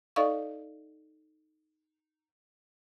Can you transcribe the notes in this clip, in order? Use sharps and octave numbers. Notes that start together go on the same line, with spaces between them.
D#4 A4 D5 D#5 F5 C#6